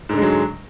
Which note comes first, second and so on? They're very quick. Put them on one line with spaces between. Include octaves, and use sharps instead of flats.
G#2 D3 G#3 F#3